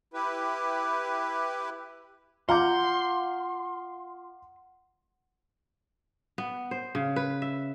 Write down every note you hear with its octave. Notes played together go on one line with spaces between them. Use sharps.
E4 G4 B4
F4 F5 F#5 A#5 C6 D6 G6
B3
C5
C#3
B4
E5